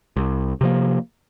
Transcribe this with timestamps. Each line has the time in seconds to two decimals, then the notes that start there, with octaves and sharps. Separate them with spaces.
0.17 C2
0.61 C3 F3 A#3